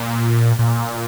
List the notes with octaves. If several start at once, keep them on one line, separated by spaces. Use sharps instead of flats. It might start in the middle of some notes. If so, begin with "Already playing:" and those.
Already playing: A#2
A#2